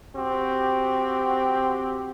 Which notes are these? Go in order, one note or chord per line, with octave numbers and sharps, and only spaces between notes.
C4 F#4 G4